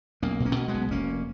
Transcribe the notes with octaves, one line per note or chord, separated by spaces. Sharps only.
B1 A#3 C#4
B2
A#3 C#4
B2
G#3 B3
B1
F1 A#3 C#4